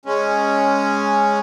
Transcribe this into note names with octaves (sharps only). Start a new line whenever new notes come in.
G#3 C#4